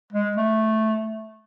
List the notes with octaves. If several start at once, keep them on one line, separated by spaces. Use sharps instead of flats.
G#3
A3